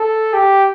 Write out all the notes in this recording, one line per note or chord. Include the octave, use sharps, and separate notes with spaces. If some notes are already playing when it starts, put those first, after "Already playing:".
Already playing: A4
G4